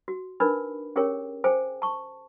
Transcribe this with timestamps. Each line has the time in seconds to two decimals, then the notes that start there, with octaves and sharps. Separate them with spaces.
0.08 F#4
0.40 D4 D#4 A#4 B4 B5
0.96 C#4 G4 G#4 A#4 C#5 G5
1.44 G#4 C5 G5 G#5
1.82 A5 C#6